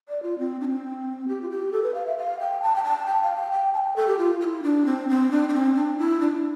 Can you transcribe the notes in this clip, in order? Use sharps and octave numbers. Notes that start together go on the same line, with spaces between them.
D5
F4
C4
D4
C4
G4
F4
G4
A4
B4
F5
E5
F5
G5
A5
G5
A5
G5
F5
G5
G5
A5
G5
A4
G4
F4
F4
E4
D4
C4
C4
D4
D4
C4
D4
E4
D4